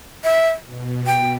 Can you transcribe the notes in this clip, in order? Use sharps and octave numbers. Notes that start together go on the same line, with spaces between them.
E5
B2
B2 G5